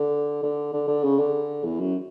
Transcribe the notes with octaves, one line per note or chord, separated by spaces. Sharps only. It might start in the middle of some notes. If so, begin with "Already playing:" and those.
Already playing: D3
D3
D3
D3
C#3
D3
E2
F#2